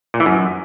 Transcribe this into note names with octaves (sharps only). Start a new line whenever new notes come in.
A#2
E3
F#2